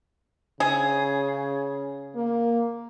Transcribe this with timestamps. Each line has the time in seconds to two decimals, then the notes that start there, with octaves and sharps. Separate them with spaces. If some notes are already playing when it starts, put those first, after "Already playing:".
0.60 C#3 G#4
2.15 A#3